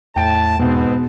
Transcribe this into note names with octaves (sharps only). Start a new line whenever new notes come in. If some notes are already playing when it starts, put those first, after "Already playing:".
E2 A2 G5 A5 D7
G#2 B2 B3 C4